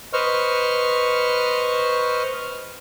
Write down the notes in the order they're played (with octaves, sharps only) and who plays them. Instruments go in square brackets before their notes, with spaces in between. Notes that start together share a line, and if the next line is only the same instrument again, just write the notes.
[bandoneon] B4 C5 D#5 C#6 F6